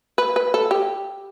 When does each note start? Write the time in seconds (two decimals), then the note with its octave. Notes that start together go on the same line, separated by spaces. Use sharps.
0.18 B4
0.36 B4
0.54 A4
0.71 G4